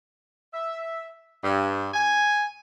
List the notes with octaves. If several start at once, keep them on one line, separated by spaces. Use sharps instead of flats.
E5
G2
G#5